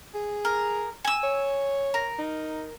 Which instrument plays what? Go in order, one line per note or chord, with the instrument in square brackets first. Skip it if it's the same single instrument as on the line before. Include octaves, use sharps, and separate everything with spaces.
[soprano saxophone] G#4
[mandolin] A#4
G#5 E6
[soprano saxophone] C#5
[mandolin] A#4
[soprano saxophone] D#4